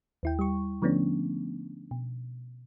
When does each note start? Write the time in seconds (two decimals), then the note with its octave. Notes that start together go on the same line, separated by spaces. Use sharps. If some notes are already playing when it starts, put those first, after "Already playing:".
0.23 D#2 E4 G5
0.39 G3 C#6
0.82 D3 F3 A3 B3 C#4 D4
1.91 B2